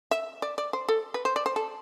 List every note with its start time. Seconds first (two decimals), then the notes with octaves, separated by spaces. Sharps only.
0.11 E5
0.42 D5
0.58 D5
0.73 C5
0.88 A4
1.14 B4
1.25 C5
1.36 D5
1.46 C5
1.56 A4